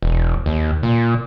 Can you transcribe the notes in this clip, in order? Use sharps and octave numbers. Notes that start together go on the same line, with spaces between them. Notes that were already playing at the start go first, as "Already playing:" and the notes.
E1
D#2
A#2